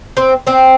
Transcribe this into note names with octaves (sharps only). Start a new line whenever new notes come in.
C4 C5
C4 C5